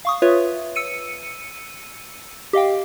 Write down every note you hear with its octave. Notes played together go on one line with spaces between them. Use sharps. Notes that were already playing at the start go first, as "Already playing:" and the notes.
F5 C#6 D#6
F4 B4 C#5 E5
E6 C#7 D#7
G4 D#5 F5 G5